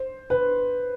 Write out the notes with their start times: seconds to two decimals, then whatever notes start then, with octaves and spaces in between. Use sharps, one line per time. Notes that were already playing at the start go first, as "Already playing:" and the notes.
Already playing: C5
0.30 B4